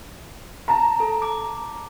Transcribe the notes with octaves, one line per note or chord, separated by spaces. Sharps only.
A5 A#5
A4
D6
D6